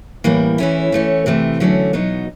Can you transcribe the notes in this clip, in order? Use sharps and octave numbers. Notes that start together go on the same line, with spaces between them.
A2 E3 G3 A#3
E3 A3 C#4 E4
E3 A3 C#4
C3 E3 A3 C4
D3 F#3 A3 C#4
B2 F#3 B3 D#4